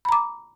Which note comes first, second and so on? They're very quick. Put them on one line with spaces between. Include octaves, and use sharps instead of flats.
B5 A#5 D6